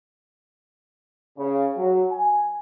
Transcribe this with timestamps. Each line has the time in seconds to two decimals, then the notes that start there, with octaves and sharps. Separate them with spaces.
1.38 C#3
1.77 F#3
2.11 G#5